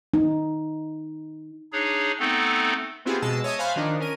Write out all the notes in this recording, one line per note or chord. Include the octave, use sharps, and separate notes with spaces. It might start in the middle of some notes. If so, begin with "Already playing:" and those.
D#4
D4 D#4 G#4 C#5
A3 B3 C4 D#4 A4
B3 C4 E4 F4 G4 G#4
B2 G#3 A5 E6
C#5 D#5 E5 A5 D#6
C5 F5 G#5 A5 B5 F#6
D#3 F3 D4 D#4
C#4 A#4 D#7